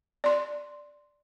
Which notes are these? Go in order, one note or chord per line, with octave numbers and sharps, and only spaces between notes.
D5 C6